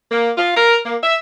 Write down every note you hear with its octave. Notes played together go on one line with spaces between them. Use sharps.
A#3
F4
A#4
A#3
E5